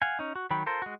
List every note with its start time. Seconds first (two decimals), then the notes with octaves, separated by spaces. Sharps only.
0.02 F5 F#5 G#5
0.19 C#4 D#4
0.36 F#4
0.50 D#3 F#3 G5 B5
0.66 F4 A4 A#4 C5
0.82 G#3 F#4